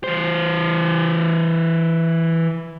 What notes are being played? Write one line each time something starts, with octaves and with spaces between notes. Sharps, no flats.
E3 C5